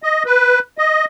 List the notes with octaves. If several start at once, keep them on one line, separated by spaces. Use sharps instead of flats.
D#5
B4
D#5